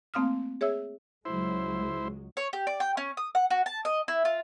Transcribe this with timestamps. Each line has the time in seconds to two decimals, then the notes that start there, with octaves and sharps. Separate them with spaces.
0.14 A3 A#3 C4 F5 D#6 F6
0.61 G#4 C#5 E5 E6
1.25 C#2 F#3 G#3 E4 C5
2.37 C#5
2.53 G4
2.67 D5
2.80 G5
2.97 C#4
3.17 D#6
3.35 F#5
3.50 F#4
3.66 A5
3.85 D#5
4.08 E4
4.25 F4